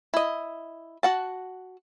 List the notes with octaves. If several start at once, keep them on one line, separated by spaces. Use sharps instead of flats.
E4 D#5
F#4 F#5 A5